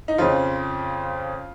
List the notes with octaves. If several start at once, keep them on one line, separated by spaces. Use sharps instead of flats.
D#4
F2 C#3 F3 F4